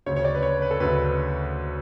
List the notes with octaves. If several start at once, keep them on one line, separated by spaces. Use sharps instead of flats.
D2 C#3 C#5
C#5
D5
B4
C#5
B4
A4
D2 C#3 B4